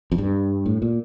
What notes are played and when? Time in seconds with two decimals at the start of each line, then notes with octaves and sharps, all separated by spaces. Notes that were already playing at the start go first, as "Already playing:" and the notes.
0.12 F2
0.18 G2
0.66 A2
0.82 A#2